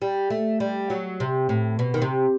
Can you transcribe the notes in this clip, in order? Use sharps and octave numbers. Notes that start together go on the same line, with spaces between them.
G3
A3
G3
F#3
C3
A2
B2
D#3
C3